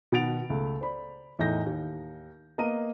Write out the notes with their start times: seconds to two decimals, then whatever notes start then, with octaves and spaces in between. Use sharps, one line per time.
0.12 B2 D#3 F#5 A6 D7 F7
0.50 C#2 A3
0.81 C5 D5 B5
1.39 E2 A2 D#4 G6 A#6
1.66 D#2
2.58 A#3 B3 D#5 A#5 D#7